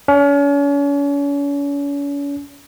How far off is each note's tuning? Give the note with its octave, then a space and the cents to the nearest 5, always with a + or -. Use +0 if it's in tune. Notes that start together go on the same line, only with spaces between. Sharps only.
C#4 +40